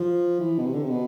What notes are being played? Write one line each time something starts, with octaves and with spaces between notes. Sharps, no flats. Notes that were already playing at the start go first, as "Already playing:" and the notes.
Already playing: F3
E3
B2
C3
D3
C3
B2